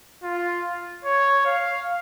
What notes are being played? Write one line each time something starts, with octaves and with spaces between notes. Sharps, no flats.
F4
C#5
F5